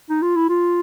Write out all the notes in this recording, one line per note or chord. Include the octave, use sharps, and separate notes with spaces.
D#4
F4
E4
F4